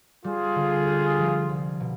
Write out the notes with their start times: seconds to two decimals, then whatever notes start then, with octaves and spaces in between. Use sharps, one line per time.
0.24 G3 F4 G#4
0.56 D3
0.87 G4
1.18 F3
1.49 C2
1.80 B2